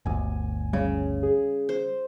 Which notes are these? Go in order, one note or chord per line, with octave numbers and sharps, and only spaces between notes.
G1 D2 G#5
C#3 G3
G#4
C5